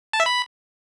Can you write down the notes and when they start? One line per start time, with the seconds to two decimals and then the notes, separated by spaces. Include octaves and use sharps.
0.13 A5
0.20 E5
0.26 B5